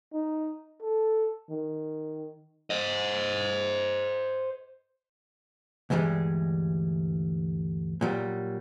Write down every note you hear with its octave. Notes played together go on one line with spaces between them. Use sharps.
D#4
A4
D#3
C5 D#5
D2 G2 E3 G3 G#3
A#2 F#3 G3